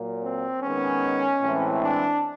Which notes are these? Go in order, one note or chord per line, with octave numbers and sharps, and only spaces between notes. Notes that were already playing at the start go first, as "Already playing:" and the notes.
Already playing: A#2 F#3 A#3
C4
D#3 G#3 B3 C#4
A2 E3 G#3 C4
D4